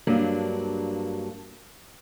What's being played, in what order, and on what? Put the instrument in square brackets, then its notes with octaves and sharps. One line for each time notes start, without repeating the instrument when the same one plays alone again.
[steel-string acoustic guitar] G2 F#3 A#3 D4